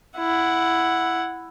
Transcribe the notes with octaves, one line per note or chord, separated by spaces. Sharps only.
E4 F#5